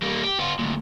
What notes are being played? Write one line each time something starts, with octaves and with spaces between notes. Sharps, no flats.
G3 A#3
G4
B3 F4
D2 A#2